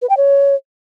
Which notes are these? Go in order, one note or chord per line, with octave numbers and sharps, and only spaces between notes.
B4
G5
C#5